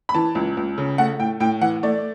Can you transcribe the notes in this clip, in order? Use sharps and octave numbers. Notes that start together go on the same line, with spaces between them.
B5
E3 A5
C#2
C#2
C#3
A3 F#5
A2 G5
A2 G5
E3 F#5
A3 D5